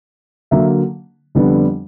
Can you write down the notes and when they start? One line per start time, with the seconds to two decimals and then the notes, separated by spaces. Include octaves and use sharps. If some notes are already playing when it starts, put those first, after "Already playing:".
0.51 D3 F#3 A#3 E5
1.35 F2 D3 G3 B3 D4